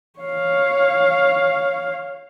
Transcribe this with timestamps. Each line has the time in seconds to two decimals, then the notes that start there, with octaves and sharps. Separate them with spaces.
0.19 C#5 F5